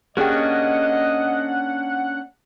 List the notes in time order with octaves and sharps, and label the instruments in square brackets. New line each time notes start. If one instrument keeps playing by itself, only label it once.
[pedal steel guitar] A#3 C#4 D4 [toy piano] G4 G#4 G5 [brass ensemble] D#5 [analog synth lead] F#5